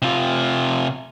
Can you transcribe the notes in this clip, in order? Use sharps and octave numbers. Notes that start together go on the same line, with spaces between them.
C3 F4